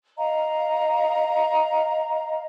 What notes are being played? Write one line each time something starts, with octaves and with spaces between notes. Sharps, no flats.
D#5 F5 A#5